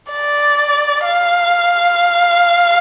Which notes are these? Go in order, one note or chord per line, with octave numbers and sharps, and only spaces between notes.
D5
F5